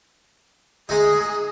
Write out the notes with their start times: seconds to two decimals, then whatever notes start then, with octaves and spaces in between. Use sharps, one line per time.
0.89 G#3 D#4 G#4